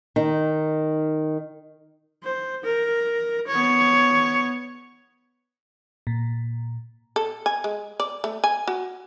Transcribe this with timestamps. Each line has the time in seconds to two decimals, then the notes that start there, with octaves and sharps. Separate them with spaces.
0.16 D#3 D#4
2.24 C5
2.64 A#4
3.48 B3 C#5
6.07 A#2
7.16 A4
7.46 G#5
7.64 G#3
8.00 D5
8.24 A3
8.44 G#5
8.67 F#4